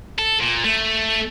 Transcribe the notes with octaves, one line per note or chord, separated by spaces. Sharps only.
A4
A#2
A3